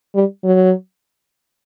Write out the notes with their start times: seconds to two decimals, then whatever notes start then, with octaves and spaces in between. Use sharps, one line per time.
0.15 G3
0.44 F#3